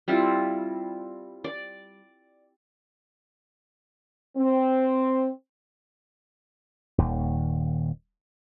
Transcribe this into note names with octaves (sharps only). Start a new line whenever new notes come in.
G3 C4 E4 F4
D5
C4
D#1 D#2